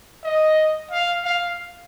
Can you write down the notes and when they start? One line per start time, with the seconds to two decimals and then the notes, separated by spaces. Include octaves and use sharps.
0.24 D#5
0.91 F5
1.25 F5